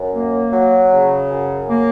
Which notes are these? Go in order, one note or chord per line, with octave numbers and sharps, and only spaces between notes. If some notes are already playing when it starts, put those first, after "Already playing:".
Already playing: F#2
A#3
F#3
C#3
F#2
A#3